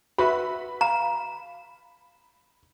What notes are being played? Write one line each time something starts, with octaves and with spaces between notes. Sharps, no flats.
F#4 B4 E5 B5
F5 A#5